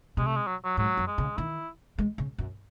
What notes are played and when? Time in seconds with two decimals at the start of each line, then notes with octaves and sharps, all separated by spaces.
0.17 C3 G#3
0.27 A3
0.36 G#3
0.47 F#3
0.65 F#3
0.77 G#2 F#3
0.97 F#2
1.07 G#3
1.18 C#3
1.37 D#3 E4
1.98 G#3
2.18 C#3
2.38 F#2